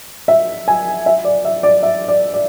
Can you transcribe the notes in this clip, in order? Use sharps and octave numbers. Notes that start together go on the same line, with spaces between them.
E5
G#5
E5
D5
E5
D5
E5
D5
D5